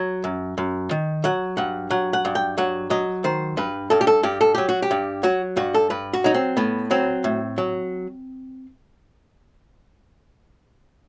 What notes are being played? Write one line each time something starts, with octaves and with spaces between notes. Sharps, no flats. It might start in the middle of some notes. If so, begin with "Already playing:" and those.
Already playing: F#3
F#2
F#2
D#3
F#3 F#5
G2 F#5
F#3 F#5
F#5
G2
G5
F#3 F#5
F#3 D#5
D#3 C5
G2 B4
G2 A4
G4
A4
G2 G4
A4
F#3 G4
F#4
G4
G2
F#3 F#4
G2 F#4
A4
G2 B4
F#4
F#3 D#4
C4
A2 B3
F#3 C4
A2
F#3